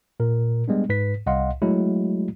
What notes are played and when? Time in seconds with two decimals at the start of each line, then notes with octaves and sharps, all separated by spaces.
0.20 A#2 A#4
0.68 G3 G#3 B3 D4
0.89 G#2 B4 B6
1.26 C2 D#5 F5 F#5 C6
1.62 F#3 G#3 A3 E4 F#4